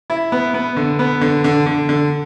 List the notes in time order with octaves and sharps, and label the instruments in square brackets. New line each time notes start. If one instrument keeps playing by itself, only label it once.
[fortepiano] E4
B3
B3
D3
B3
D3
D3
D3
D3